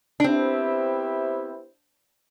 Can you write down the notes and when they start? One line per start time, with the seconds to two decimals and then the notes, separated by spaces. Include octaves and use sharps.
0.20 D4
0.24 B3 C4 E4 G4 C5 E5